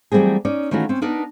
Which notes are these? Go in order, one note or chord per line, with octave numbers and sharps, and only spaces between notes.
E3 F#3 G3 A3 C4 G#4
C#4 D#4 D5
D#3 E3 A3 C#4 F4 F#4
C4 C#4
B3 D4 D#4 A#4